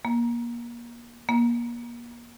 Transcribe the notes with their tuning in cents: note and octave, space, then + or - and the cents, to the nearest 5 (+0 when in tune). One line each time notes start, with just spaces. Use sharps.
A#3 +30
A#3 +35